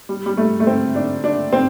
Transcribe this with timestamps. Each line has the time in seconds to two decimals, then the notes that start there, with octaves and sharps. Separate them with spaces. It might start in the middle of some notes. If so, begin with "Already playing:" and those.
0.09 G3
0.26 G3
0.37 A3
0.60 A3
0.67 C4
0.95 D4
1.24 D4
1.52 C4